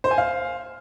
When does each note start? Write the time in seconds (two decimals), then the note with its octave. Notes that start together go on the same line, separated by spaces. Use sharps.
0.04 C5
0.11 G#5
0.18 F5